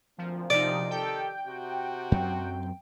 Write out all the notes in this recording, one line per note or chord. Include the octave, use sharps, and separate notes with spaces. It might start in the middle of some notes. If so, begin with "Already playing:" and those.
D2 A#2 F3 C4
C3 F3 D#4 D5
D#3 G4 A4 G5
C3 F#4
F#2 F#3 C4